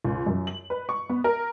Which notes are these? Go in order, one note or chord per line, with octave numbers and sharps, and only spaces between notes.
C#2
F#2
F#7
B4
C#6
B3
A#4